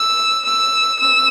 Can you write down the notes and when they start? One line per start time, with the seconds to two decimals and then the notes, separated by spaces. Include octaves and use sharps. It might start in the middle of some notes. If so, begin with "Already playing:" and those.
Already playing: E6
0.46 E6
1.00 E6